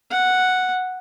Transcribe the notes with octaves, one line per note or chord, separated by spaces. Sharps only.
F#5